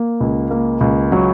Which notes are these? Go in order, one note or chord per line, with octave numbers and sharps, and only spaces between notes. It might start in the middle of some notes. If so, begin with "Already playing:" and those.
Already playing: A#3
C#2
A#3
C#2
F#3